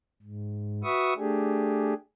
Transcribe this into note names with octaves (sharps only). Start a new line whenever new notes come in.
G#2
F#4 B4 E5 C#6 D#6
A3 D4 G4 G#4